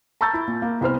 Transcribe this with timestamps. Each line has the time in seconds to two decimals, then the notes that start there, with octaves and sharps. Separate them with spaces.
0.21 A5 A#5 C#6 E6 G6 A6
0.34 E4
0.48 A#2
0.62 A#3
0.81 C2 B3 C5 F6